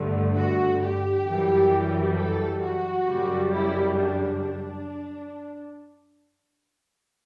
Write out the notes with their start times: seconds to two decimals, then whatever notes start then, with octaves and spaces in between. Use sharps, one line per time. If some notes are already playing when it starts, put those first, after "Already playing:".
Already playing: G1 G2 D3 A3
0.36 F#4
0.82 G4
1.26 F#2 E3 G3
2.17 A4
2.61 F#4
3.06 F#2 C#3 G3
3.51 E4
3.96 D4
4.41 D4